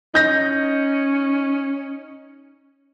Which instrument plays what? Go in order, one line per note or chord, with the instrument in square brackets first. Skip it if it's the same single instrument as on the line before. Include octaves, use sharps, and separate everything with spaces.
[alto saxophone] C#4 [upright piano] D#4 G6 A#6